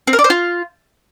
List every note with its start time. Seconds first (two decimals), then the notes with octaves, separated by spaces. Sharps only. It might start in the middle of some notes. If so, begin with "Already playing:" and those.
0.07 C4
0.13 A#4
0.19 D5
0.24 C5
0.30 F4